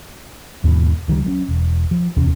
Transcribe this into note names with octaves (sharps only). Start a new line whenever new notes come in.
D#2 G#2 B2 E3
C#2 D#3 E3 G3
F#3 A3 C#4
E1
F3
D1 E2 C3 C#4